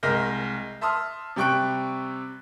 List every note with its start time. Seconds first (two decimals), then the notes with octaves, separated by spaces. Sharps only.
0.03 C2 G#3 A#4 F6 G6 A#6
0.81 E5 A5 C6 D#6 F6
1.36 C3 G3 G5 C#6 F#6 D7